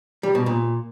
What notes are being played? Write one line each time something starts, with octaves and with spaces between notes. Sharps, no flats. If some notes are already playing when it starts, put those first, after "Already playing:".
G3
B2
A#2